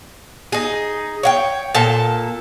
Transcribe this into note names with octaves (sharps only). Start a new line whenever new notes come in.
D#4 G#4
C#5 F5 G5
A#2 A4 A5